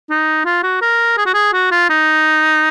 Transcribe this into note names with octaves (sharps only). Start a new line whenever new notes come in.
D#4
F4
F#4
A#4
G#4
F#4
G#4
F#4
F4
D#4